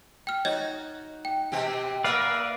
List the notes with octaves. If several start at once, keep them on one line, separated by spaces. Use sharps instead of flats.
G5 F6
D#4 F#4 C#5 D#5 G#6
G5
B2 C4 G4
A#3 A#4 B4 D5 E5 F5